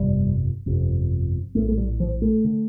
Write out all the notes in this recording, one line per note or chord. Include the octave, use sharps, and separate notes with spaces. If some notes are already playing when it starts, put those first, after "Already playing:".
Already playing: G1 F2 C3 G3
G1 F2 C3
A#1 A2 A3
A3
G3
F3
A3
D3